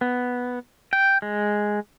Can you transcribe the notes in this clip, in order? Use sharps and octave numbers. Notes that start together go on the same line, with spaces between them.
B3
G5
G#3